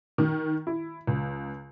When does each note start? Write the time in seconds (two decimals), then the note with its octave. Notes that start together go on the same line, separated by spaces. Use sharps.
0.18 D#3
0.67 E4
1.07 C#2